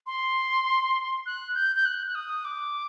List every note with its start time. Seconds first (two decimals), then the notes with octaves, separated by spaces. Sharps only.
0.06 C6
1.26 F#6
1.55 G6
1.76 G6
1.85 F#6
2.07 F#6
2.15 D#6
2.45 D6